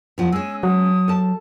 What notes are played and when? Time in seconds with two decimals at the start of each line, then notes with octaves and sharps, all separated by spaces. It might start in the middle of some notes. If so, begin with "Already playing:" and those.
0.18 E2 F3 F#5
0.32 G#3 C#4 E6
0.63 F#3 D#6
1.08 A4 A5